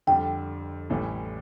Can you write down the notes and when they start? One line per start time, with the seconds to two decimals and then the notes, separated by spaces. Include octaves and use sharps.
0.07 F2 D3 G3 G5
0.90 A1 A2 E3 G3